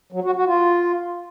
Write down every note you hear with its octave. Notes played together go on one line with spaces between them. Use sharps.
F#3
F#4
F#4
F4